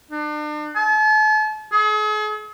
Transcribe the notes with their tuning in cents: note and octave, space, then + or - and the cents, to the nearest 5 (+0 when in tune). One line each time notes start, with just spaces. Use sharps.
D4 +40
A5 -40
G#4 +40